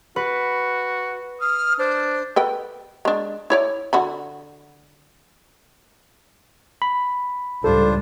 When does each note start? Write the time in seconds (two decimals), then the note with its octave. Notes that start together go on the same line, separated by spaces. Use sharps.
0.16 F#4 B4
1.41 D#6 F6
1.79 D4 C5
2.36 A4 B4 G5
3.05 G#3 D4
3.50 E4 C#5 D5
3.93 D3 F#4 B5
6.82 B5
7.64 C#2 A2 G3 D4 F4 A4 C5